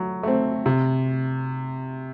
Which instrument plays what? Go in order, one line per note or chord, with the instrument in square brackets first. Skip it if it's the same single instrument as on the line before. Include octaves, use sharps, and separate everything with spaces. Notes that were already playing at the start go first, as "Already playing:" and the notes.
Already playing: [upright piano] F#3 A3
A3 C4
C3